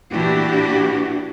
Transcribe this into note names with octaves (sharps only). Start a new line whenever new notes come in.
A#2 E3 D4 E4 F#4 G4